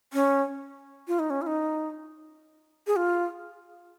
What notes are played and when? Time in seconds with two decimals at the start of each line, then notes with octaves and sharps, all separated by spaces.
0.13 C#4
1.08 F4
1.19 D#4
1.30 C#4
1.42 F4
1.47 D#4
2.87 G#4
2.96 F4